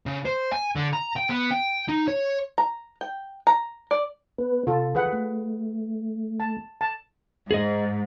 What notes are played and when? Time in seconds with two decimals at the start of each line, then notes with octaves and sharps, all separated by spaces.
0.06 C#3
0.25 C5
0.53 G#5
0.76 D3
0.93 A#5
1.17 G5
1.30 B3
1.51 G5
1.89 D#4
2.08 C#5
2.58 A#5
3.01 G5
3.47 A#5
3.91 D5
4.38 B3 B4
4.67 C3 F4 A4
4.95 E3 G#4 B4 F#5
5.13 A3
6.40 A5
6.81 A5
7.51 G#2 G#4 D#5